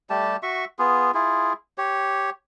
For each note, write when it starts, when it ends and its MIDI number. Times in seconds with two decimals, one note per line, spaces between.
0.10 0.37 55
0.10 0.37 57
0.10 0.37 67
0.10 0.37 81
0.43 0.65 66
0.43 0.65 76
0.43 0.65 85
0.79 1.11 59
0.79 1.11 65
0.79 1.11 68
1.14 1.53 64
1.14 1.53 65
1.14 1.53 68
1.78 2.30 67
1.78 2.30 73